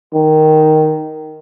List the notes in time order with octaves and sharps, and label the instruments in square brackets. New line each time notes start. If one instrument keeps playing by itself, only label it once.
[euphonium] D#3